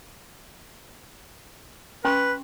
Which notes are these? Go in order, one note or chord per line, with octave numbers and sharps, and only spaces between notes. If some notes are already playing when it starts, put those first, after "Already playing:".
C#4 B4 C6 C#6